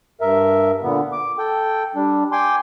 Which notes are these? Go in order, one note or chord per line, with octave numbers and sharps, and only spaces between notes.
G2 A#4 E5
A#2 D3 B3
D6
A4 G5
G3 D4
G5 G#5 C6 D6